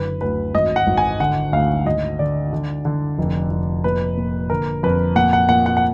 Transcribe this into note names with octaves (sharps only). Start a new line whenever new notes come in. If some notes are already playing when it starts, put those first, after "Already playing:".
Already playing: F#1 D3 B4
D2 B4
G#1 D#5
F#5
G#1
G#5
D3 F#5
D2 F5
G#1 D#5
D3 D5
D3
D3
F1
F1
A#2 B4
A#2
D3 A#4
F2 B4
A#2 F#5
F#5
A#2 F#5
F#5
F#5